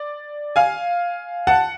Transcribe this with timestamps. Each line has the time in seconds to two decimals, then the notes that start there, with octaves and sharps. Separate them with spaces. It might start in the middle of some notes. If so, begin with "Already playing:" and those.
Already playing: D5
0.56 F5 G#5
1.47 F#5 A5